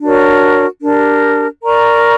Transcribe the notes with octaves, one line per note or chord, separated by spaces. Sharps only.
D4 F#4 A#4 C#5
D4 G4 A#4
A#4 D5 A#5 C#6